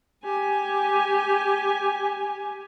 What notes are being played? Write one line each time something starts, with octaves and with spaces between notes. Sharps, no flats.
G4 G#5